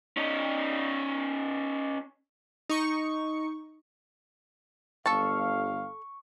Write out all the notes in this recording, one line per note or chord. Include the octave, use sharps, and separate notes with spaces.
C#4 D#4
D#4 C#6
G1 A4 F5 A5 C#6